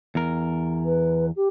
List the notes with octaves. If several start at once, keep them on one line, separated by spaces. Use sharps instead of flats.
E2 A#4
B4
G4